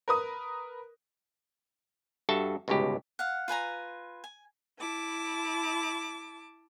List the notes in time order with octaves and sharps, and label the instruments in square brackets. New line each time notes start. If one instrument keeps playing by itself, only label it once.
[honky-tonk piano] A#4 B4 D#6
[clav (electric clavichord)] G2 F#4 A4 E5 A5
G1 C#2 G#2 B2 G4
[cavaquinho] F5 F#5
F4 B4 G#5 A#5
G#5
[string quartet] E4 A5 D6